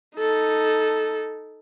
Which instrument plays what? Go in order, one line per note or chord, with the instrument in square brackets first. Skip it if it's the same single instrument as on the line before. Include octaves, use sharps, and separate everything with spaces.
[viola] D#4 A4